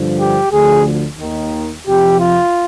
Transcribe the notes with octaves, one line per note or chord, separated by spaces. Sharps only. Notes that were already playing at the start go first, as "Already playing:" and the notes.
Already playing: G2 D3 F3
G4
D2 D3 F3 G#4
D#2 D#3
F2 C3 F3 G4
F4